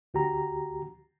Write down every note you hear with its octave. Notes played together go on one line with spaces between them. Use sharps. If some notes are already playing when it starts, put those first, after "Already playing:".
D2 F#4 G4 A#5